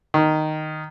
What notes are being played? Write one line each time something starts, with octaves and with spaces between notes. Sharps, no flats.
D#3